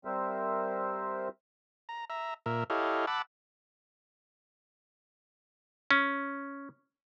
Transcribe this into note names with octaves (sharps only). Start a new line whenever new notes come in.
G3 C4 A#4 C5 E5
A#5
E5 A#5
A#2 A#4 E5
E4 G4 A4 C#5 D#5 F5
F#5 A5 B5 D6 E6
C#4